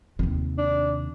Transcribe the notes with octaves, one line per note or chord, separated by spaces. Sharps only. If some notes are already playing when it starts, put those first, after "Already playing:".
D#2 C3
D4